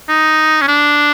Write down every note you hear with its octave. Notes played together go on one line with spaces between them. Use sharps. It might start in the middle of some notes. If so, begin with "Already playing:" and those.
D#4
C#4
D4